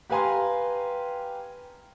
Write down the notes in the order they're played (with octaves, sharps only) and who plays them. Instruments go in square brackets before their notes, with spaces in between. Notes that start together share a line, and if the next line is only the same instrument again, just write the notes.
[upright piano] G4 B4 F5 G#5 A#5 C6